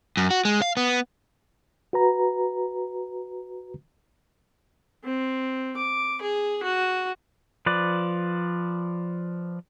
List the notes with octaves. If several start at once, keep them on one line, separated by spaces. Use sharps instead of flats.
F#2
F#4
G#3
F5
B3
F#4 B4 A#5
C4
D6
G#4
F#4
F3 B4 D5